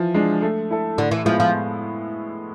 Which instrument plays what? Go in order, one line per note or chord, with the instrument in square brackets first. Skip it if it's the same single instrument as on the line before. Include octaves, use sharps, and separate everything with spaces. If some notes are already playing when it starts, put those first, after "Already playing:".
Already playing: [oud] E3 [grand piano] F3
[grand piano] G#3 D4
A3
E4 A4
[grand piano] A2 [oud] D3
[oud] E3
[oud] F3 [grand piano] G#3 B3 E4
[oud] F3